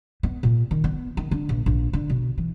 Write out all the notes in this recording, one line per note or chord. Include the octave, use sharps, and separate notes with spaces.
B3
A#2
D#3
B3
D#3
D3
A#1
A#1
D3
B2
E3